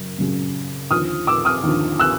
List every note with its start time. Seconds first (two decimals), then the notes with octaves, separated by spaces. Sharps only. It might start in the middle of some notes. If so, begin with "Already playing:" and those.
Already playing: F#2 C#3 F#3
0.18 F#2 C#3 F#3
0.91 D#2 D3 F3 D#6 F6
1.27 D6 E6
1.45 D#6 F6
1.63 D#2 D3 F3
2.00 E6 F#6